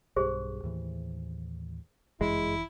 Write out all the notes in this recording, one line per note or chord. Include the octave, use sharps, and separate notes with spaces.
B1 G2 G4 G#4 C5
D#2 A2 E3
G1 F#2 E3 G#3 E4